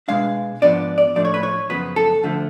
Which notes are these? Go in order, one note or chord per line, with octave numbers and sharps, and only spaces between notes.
B2 G#3 D4 F5
G#2 F3 B3 D4 D5
D5
A2 F3 A3 D4 D5
C#5
B4
C#5
F#2 C#3 F3 B3 B4
A4
D2 D3 F3 A3